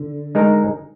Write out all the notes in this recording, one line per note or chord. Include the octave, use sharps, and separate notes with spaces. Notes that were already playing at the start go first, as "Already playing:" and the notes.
Already playing: D3
G#3 D#4 A#4